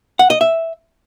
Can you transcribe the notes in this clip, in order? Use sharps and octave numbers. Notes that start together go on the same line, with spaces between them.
F#5
D#5
E5